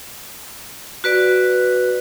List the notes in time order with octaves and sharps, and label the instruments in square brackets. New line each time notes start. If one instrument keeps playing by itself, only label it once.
[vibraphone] F#4 B4 D5